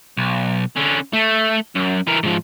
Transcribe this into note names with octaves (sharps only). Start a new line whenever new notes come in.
B1
D3 C#4
A3
F#2
E3 A#4
G#2 F3